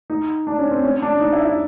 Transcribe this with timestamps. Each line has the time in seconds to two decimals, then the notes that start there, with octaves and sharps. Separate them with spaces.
0.10 D#4
0.47 D4
0.59 C#4
0.71 C4
0.83 C#4
1.02 D4
1.20 D#4
1.33 E4
1.45 E4